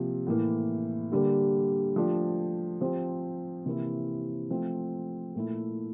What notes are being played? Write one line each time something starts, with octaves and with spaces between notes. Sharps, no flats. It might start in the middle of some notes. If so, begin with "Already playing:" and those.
Already playing: C3 F3 A#3
A2 E3 A#3
D3 G3 A#3
F3 A3 D4 G4
F3 C4 G4 C5
C3 E3 A#3 E4
F3 A3 C4
A#2 A3 E4